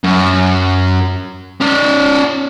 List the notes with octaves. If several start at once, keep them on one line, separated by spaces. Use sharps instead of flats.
F#2
C#4 D5